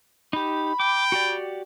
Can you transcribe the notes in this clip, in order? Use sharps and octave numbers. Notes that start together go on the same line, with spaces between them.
D#4 G4 B5
G5 D6
F#4 G4 D5